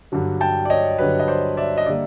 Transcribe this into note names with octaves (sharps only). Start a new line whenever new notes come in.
G2 D3 F#3
G5 A5
D5
C#5 D#5
G2 D3 F#3 B4 C#5
D#5
C5 D5
D5 E5
D#5
D3 G3 A#3 D5 E5